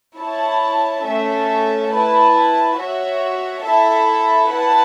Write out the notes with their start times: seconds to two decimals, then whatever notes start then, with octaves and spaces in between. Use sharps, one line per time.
0.17 E4 C#5 A5
1.04 A3 C#4 A4 E5
1.90 E4 B4 A5
2.76 F#4 C#5 E5
3.63 E4 A4 E5 A5
4.48 E4 B4 F#5 A5